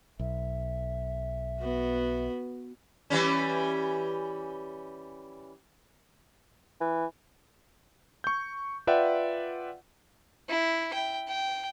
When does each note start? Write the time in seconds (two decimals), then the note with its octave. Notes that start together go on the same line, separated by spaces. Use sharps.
0.19 B1 E5
1.60 B3 F#4
3.10 E3 G3 C#4
6.80 E3
8.24 C#6 G6
8.87 F4 B4 D5 E5 F#5 G5
10.49 E4
10.94 G5
11.28 G5